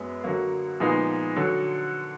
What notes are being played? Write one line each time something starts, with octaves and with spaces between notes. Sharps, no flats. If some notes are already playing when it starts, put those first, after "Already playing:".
Already playing: F#2 G#3 B3
D3 F#3 A#3
A#2 F3 G#3 B3 D#4
D3 F#3